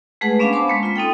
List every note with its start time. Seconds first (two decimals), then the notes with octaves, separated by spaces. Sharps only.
0.21 G#3 A3 G#4 B4 F#5
0.39 B3 C#4 D4 F5 G#5
0.53 C5 A5 B5 C6 D6
0.68 G#3 A#3 C#4
0.83 F4 C6
0.96 C4 D#4 A4 G5